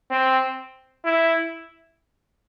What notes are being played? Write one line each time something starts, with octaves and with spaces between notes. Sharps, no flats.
C4
E4